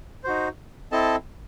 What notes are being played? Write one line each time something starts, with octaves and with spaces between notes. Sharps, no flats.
D#4 F#4 C5
C4 E4 A4 D#5 A5